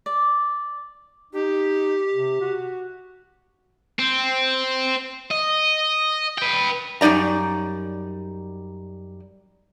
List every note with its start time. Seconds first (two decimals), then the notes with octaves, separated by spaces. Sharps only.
0.06 D5
1.33 D#4 G4
2.14 C3
2.41 F#4
3.99 C4
5.31 D#5
6.38 B4 G5
7.01 F#2 G3 D#4 D5 A#5